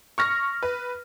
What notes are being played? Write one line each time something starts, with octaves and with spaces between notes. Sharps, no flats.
C#6 F6 A#6
B4